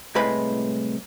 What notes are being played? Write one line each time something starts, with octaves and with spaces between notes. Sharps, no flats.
C2 A2 G#3 B4 B5